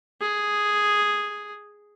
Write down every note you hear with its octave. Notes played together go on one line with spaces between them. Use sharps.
G#4